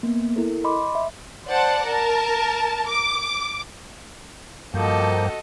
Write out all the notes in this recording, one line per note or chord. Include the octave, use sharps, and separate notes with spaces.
A#3 B3
E4 A4 A#4
D#5 B5 C6 D6
E5
C5 D5 F#5 A5
A#4 A5
D6
G2 F3 A#3 F#4 A4 D#5 G5